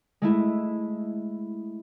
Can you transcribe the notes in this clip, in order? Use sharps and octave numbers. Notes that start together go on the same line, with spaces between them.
G#3 A3 E4